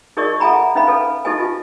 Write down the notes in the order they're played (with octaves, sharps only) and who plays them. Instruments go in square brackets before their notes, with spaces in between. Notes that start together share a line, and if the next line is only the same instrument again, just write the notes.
[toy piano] D#4 G#4 A#4 D5 D#5 C#6
A4 E5 F#5 G#5 A#5 B5
C#4 D#4 B4 E5 F5 B5
A4 B4 G#5
D#4 G4 A4 B4 D#5 G#5
F4